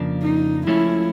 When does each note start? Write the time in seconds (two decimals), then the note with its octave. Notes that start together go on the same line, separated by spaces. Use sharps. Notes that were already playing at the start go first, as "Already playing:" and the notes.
Already playing: F2 C#3 F3 A#3 D4
0.23 D#4
0.67 C#2 C#3 F3 A3 C#4 E4